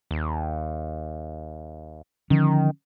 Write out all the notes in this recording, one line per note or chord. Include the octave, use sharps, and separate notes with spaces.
D#2
D3 D#3 F3 C#4